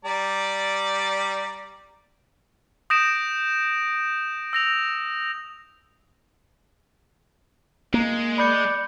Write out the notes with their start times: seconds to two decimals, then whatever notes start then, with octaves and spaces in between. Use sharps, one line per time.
0.05 G3 D5 A#5
2.90 D#6 G6 A#6 D7 E7
4.53 E6 A#6 F7
7.94 G#3 A#3
8.38 D5 B5 G6 C#7